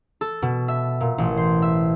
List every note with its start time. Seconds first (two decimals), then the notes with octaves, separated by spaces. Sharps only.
0.21 A4
0.42 B2
0.68 E5
1.00 A#2
1.18 A1
1.37 C5
1.62 E5